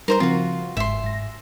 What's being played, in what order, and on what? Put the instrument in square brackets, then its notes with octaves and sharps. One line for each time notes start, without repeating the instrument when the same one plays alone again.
[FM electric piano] G3 D#4 [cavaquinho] A#4 C5 A#5
[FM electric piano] C#3 F3 C4 [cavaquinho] F4 F#4
[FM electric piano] G1 G#2 [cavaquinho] E5 C6
[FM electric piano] G#2 A#6